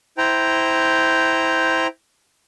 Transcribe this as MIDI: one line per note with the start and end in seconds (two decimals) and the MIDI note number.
0.18 1.87 64
0.18 1.87 72
0.18 1.87 79
0.18 1.87 82